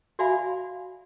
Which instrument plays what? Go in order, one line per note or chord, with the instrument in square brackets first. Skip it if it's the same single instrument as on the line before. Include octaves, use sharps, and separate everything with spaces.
[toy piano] F#4 D5 E5 F5 G#5 B5